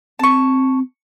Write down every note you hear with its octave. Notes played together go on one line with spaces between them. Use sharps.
C4 A5 C#6